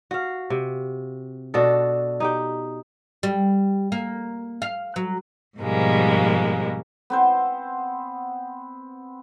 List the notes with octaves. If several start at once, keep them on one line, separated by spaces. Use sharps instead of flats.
F#4 F5
C3
B2 D4 F#4 A4
D#4 G4 G5
G3
A#3
F5
F#3
G#2 B2 F3 G3 G#3 A#3
B3 C4 C5